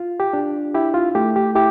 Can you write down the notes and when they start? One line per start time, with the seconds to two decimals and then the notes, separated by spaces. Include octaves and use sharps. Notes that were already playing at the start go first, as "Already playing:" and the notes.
Already playing: F4
0.20 G4
0.33 D4
0.74 E4 G4
0.94 F4
1.15 A3 G4
1.36 G4
1.55 E4 G4